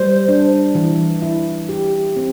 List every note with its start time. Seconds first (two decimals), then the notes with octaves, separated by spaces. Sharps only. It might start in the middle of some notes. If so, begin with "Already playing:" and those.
Already playing: G3 C5
0.28 D4
0.75 E3
1.22 E4
1.69 G4
2.16 C4